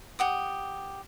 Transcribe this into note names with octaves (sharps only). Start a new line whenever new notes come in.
G4 F#5 D#6